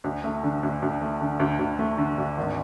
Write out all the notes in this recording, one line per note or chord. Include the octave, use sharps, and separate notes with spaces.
D2
A3
D3
D2
D2
A3
D3
D2
D2
A3
D3
D2
G#1